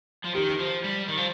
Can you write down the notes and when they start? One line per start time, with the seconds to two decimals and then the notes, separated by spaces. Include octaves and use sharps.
0.25 F3
0.34 D#3 G4
0.59 F3
0.84 G3
1.08 D#3
1.17 F3